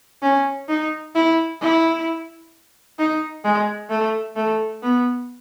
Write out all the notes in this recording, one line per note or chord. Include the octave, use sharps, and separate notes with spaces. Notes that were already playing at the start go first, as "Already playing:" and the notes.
C#4
D#4
E4
E4
D#4
G#3
A3
A3
B3